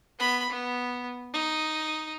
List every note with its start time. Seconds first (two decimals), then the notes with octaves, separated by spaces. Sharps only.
0.19 B3 B5
0.50 B3
1.34 D#4